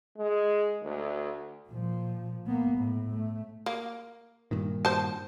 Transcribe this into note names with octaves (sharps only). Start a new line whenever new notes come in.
G#3
D2
A#2 F3
A#3 B3
A2
A3
A#3
G2 A#2 D#3
C5 A5